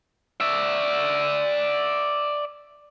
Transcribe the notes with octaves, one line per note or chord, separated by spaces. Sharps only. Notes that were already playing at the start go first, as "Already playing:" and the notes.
D5 E5